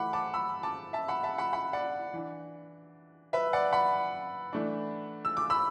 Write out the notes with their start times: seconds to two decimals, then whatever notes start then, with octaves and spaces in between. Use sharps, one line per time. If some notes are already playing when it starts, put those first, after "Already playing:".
Already playing: E3 A3 E4 F#5 B5 D6
0.13 A5 D6
0.34 B5 E6
0.63 A5 D6
0.93 E5 A5
1.08 F#5 B5
1.23 E5 A5
1.38 F#5 B5
1.53 F#5 B5
1.73 D5 F#5
2.13 E3 D4
3.33 B4 E5
3.53 D5 F#5
3.73 F#5 B5
4.53 E3 A3 D4
5.25 E6
5.37 D6
5.50 B5 E6